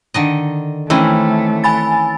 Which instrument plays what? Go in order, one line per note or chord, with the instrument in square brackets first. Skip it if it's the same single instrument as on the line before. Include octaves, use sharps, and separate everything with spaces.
[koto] D3 D#3 D#5
[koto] D#3 C4 [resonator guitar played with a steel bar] E3 C#4 [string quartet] A3
[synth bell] G#5 B5 A6